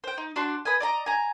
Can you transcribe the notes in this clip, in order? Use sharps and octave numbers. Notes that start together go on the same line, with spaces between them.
C5 G5
D#4
D4 F#4 A5 C6
B4 D#5 G#5
D5 D#5 A#5
G#5 A#5